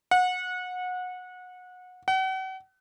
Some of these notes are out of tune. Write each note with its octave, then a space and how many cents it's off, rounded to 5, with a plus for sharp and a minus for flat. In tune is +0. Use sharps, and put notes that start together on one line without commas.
F#5 -25
F#5 +40